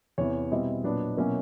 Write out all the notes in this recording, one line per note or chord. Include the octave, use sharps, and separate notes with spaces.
E2 C3 E3 C#5
B2 G3 C4 E4 D#5
A#2 F#3 B3 D4
B2 F#3 A#3 C#4 E4